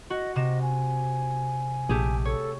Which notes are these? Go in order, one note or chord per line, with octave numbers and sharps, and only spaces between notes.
F#4 D#5
C3 D#5 E7
G#5
A#1 A3 G4 G#4
A4 C#5